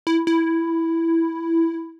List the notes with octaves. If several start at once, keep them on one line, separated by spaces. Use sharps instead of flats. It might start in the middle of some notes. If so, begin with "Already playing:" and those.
E4
E4